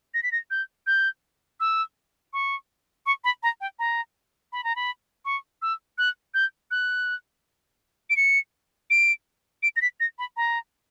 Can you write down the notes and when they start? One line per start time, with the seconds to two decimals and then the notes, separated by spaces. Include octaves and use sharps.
0.14 A#6
0.23 B6
0.32 A#6
0.51 G6
0.87 G6
1.60 E6
2.33 C#6
3.06 C#6
3.24 B5
3.43 A#5
3.61 G5
3.79 A#5
4.52 B5
4.64 A#5
4.76 B5
5.25 C#6
5.62 E6
5.98 F#6
6.34 G6
6.71 F#6
8.10 D7
8.17 C#7
8.90 D7
9.63 D7
9.76 A#6
9.82 B6
10.00 A#6
10.19 B5
10.37 A#5